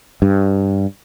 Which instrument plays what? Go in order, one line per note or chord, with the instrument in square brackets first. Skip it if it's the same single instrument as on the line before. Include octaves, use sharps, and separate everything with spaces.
[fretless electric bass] G2